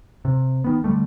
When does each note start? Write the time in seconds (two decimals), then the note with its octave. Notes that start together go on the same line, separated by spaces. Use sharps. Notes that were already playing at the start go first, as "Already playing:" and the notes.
0.25 C3
0.64 D#3 B3
0.84 D3 D#3 G3 A3